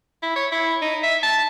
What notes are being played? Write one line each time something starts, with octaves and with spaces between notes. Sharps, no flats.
E4
C#5
E4
D#4
E5
A5